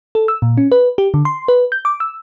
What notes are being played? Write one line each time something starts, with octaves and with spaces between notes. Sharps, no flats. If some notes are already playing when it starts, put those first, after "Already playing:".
A4
E6
A#2
C#4
B4
G4
D3
C6
B4
G6
D6
E6